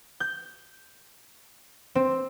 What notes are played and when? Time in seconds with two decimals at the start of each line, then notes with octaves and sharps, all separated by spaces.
0.20 G6
1.95 C4